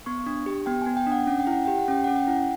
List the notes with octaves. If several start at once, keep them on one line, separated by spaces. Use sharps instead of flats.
B3 C#6
D4
G4
B3 G5
B3 G#5
G5
D4
F#5
C#4 F#5
G5
E4
F#5
G4 G5
F#5
C#4 G5
C#4 F#5
G5
E4 F#5